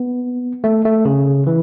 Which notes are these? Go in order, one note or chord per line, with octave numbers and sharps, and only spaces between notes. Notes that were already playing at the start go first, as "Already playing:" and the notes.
Already playing: B3
A3
A3
C#3
E3